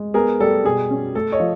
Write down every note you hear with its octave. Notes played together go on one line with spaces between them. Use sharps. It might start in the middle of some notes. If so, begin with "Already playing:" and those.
Already playing: G#3
B3 G#4 A#4
G3 A4
B2 G#4
C#4
A3 A4
C#5 D#5
F3